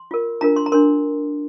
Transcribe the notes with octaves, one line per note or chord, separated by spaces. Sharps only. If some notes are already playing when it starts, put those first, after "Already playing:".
Already playing: C6
F4 A#4
D4 F4 A#4 A#5
C6
A#5
D4 A#4 C6